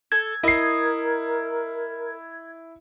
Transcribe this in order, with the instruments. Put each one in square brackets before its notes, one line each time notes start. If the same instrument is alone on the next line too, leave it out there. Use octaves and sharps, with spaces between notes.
[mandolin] A4 [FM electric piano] G#6
[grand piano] E4 C7 [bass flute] A#4 [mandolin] D#5